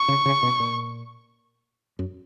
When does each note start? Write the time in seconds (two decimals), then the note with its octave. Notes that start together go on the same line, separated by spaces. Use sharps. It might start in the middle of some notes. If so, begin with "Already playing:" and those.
Already playing: C#6
0.08 C#3
0.26 C#3
0.43 B2
0.60 A#2
1.99 F#2